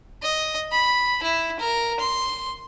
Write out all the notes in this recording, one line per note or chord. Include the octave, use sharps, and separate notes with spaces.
D#5
B5
E4
A#4
C6